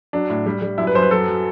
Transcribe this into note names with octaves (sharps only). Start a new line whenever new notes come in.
F#3 D4
A2
G3
G3
F#2 E4
B4
F#2 C5
B4
F#3 A4
F#3